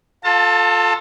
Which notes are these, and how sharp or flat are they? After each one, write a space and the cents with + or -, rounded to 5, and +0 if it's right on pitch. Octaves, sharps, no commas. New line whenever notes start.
F4 +20 A4 +0 A5 +30